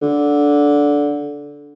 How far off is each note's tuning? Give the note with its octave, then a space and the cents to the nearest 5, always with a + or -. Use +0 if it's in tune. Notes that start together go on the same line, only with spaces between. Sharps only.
D3 -10